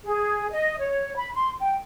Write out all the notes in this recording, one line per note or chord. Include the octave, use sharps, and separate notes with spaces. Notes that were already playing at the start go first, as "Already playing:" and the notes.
G#4
D#5
C#5
B5
C6
G5